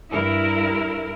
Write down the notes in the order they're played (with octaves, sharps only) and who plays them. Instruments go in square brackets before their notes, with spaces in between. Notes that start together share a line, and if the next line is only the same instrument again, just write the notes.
[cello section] G2 E4 A#4